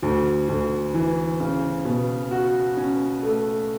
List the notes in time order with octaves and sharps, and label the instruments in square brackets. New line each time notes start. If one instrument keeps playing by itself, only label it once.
[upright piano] D2
D2
E3
C#3
B2
F#4
C#4
A3